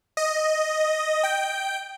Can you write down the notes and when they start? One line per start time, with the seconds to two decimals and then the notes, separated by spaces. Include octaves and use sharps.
0.17 D#5
1.23 G5